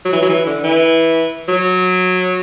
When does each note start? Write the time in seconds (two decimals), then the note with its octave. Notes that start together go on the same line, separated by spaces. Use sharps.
0.05 F#3
0.13 E3
0.22 F#3
0.29 E3
0.46 D3
0.64 E3
1.48 F#3